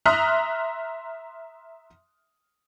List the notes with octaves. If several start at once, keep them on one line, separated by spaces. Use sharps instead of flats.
E5 A#5 C6 D#6 F6 F#6